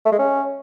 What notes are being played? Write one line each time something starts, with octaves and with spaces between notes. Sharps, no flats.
A3
G#3
C#4